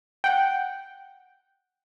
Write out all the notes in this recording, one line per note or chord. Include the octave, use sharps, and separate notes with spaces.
F#5 G5